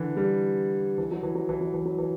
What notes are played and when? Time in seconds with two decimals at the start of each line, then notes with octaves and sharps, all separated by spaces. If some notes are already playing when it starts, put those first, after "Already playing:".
Already playing: D3 E3
0.17 G3
0.98 E3
1.11 F#3
1.23 E3
1.35 F#3
1.49 E3
1.61 F#3
1.74 E3
1.85 F#3
1.98 E3